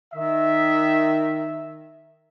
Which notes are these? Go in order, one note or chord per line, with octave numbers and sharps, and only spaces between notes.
D#3 E5